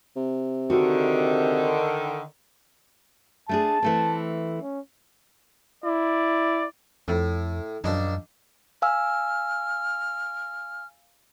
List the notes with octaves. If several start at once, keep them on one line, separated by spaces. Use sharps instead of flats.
C3
D3 D#3 F#4
A3 D4 G#4 A5
E3 A3 C4
C#4
E4 D5
F2 A2
A#1 F#2 D4 D#4
F5 G#5 E6 F6